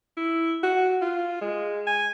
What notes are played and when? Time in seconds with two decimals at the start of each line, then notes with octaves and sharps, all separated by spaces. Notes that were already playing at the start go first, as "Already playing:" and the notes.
0.17 E4
0.63 F#4
1.02 F4
1.42 G#3
1.87 G#5